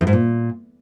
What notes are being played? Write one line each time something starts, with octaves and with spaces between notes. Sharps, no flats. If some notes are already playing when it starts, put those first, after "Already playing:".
E2
G#2
A#2